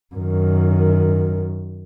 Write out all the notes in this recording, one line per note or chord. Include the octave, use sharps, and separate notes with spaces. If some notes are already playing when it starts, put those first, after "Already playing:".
F#2 D#3